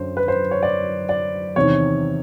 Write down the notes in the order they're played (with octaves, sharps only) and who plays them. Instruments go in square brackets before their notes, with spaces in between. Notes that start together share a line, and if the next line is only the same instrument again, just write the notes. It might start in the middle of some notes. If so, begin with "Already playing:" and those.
Already playing: [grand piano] F#2 D3 F#3 C5
B4
C5
C#5
D5
D5
E2 C3 D#3 C#5